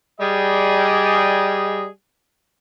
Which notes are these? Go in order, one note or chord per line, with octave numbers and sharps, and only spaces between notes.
G3 G#4 D#5